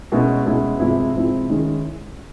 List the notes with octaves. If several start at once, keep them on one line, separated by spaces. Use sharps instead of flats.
B2 G#3 C#4 E4
B2 G#3 C#4 E4
C3 F3 G#3 C4 E4
C3 F3 G#3 C4 E4
D#3 G#3 C#4 E4